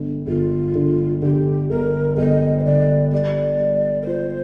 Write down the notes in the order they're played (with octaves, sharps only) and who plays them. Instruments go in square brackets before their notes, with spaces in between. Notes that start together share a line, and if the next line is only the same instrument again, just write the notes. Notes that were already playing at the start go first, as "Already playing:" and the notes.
Already playing: [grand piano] G1 D3
[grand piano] G1 [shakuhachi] F4
[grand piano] D3
[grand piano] D3 [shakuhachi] G4
[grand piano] G1 [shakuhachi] A#4
[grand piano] G1 [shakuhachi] D#5
[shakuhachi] C5
[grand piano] D3 [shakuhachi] D5
[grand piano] G3 [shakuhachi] D5
[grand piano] G3
[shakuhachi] A#4
[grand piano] F4 [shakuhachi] C5